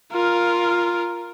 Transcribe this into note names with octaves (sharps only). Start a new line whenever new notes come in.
F4 A#4